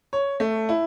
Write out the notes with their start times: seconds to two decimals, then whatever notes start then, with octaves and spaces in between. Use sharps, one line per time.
0.13 C#5
0.40 A3
0.69 E4